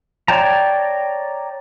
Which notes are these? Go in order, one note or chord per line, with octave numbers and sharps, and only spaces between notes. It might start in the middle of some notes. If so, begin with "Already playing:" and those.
C#5 D5 G5 A5 A#5